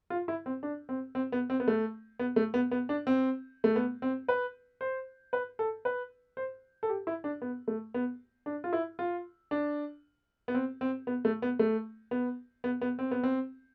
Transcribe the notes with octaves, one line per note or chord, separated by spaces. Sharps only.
F4
E4
C4
D4
C4
C4
B3
C4
B3
A3
B3
A3
B3
B3
D4
C4
A3
B3
C4
B4
C5
B4
A4
B4
C5
A4
G4
E4
D4
B3
A3
B3
D4
F4
E4
F4
D4
B3
C4
C4
B3
A3
B3
A3
B3
B3
B3
C4
B3
C4